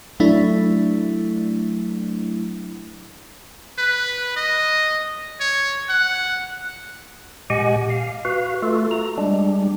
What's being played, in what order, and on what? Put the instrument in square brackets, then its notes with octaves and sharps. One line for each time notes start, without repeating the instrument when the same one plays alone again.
[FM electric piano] F#3 A3 D4 E4
[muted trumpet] B4
D#5
C#5
F#5
[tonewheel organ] A#2 G#3 G4 D#5 F#5 G#5
F5
F#4 B4 F5
A3 F4 F#4 A4
A#5
G3 G#3 D4